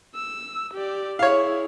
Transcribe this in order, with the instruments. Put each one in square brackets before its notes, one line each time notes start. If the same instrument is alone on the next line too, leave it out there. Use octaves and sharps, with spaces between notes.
[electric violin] E6
G4 D5
[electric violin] E4 G#4 [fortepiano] C#5 F5